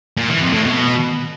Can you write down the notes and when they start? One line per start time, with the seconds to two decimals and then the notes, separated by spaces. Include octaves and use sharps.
0.17 A#2
0.29 E3
0.41 F2
0.53 A2
0.65 B2